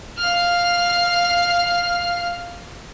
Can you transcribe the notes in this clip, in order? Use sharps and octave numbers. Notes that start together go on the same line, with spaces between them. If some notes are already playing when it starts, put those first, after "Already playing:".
F5 F6